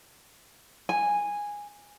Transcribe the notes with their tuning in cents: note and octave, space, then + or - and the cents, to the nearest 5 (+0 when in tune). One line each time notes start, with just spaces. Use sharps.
G#5 -10